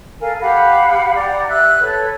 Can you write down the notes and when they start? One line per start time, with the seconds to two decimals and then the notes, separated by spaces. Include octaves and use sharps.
0.20 A4 A#4 F5 G#5
0.40 G4 F5 F#5 B5
1.15 G4 D5 F#5 A#5
1.48 E5 E6 F#6
1.80 A4 B4 C#5